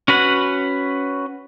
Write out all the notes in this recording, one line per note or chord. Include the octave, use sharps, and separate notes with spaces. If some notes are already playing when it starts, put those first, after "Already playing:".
C#4 F#4 B4 F#5